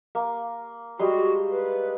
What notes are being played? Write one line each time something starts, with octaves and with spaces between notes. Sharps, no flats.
A#3
G3 G#3 F#4 C6
B4